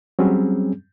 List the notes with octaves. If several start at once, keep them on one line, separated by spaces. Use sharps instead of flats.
F#3 G3 C4 C#4 G#4